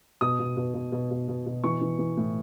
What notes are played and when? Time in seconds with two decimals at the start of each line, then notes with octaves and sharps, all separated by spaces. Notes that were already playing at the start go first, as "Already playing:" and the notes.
0.21 B2 D#6
0.39 B2
0.57 B2
0.74 B2
0.92 B2
1.11 B2
1.28 B2
1.46 B2
1.64 E3 C#6
1.81 E3
1.99 E3
2.17 A2